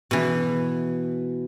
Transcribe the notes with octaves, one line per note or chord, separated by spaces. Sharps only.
B2 E3